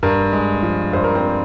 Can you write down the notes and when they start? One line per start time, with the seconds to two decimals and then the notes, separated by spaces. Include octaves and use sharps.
0.03 G2 A#4
0.33 G#3
0.63 F3
0.93 G2 C5
1.04 A#4
1.15 C4 C5